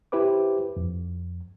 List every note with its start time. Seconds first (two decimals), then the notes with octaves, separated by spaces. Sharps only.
0.12 E4 G4 B4 C5 D6
0.76 F2